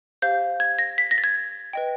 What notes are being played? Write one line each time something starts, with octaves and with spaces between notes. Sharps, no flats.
G4 C5 F5 G6
G#6
A#6
B6
A#6
A6
G#6
B4 D#5 G5